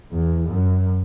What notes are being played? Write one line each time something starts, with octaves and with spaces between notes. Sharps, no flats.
E2
F#2